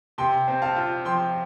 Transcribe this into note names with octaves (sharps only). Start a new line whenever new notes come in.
C3 G5 C6
C4
F5 A5
F4
F3 G5 C6